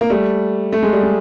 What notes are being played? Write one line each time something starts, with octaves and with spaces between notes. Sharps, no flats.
A#3
G3 A3
A3
G#3
G3
G#3